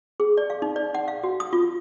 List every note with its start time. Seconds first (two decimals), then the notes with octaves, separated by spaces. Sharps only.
0.20 G#4
0.37 D5
0.50 F5
0.62 D#4
0.76 D5
0.95 F#5
1.08 F5
1.24 F#4
1.40 D#6
1.53 F4